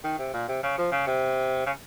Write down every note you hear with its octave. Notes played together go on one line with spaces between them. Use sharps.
D#3
C3
A#2
C3
C#3
F3
C#3
C3
C#3